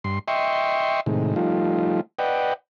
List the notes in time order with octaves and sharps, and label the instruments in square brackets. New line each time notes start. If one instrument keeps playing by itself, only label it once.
[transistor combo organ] G2 C6
D#5 E5 G5 C6 C#6
A2 C3 D#3 G#3
F3 G3 A3 D#4 F4
B4 D5 D#5 F#5 G5